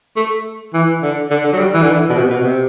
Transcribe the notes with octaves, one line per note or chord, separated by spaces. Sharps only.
A3
E3
D3
D3
D3
F#3
G3
E3
D3
E3
B2
C3
B2
C3